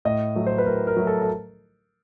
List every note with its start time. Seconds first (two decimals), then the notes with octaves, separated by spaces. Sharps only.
0.05 A2 D#5
0.36 F#3 A3
0.47 C5
0.58 B4
0.66 A2 A#4
0.87 A#4
0.97 F#3 A3
1.07 A4
1.22 A4